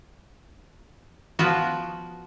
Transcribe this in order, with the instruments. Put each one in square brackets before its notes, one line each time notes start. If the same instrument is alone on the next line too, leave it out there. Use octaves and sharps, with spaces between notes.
[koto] F3 B3 F#4